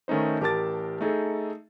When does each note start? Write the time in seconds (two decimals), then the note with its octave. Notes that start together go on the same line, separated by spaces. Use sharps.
0.08 D#3 A3 C#4 D#4 C5
0.41 A1 G4 A#4 A5 D6 A6
1.01 A3 D#4 G#4 A4